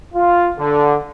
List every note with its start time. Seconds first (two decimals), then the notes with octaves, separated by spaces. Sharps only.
0.14 F4
0.57 D3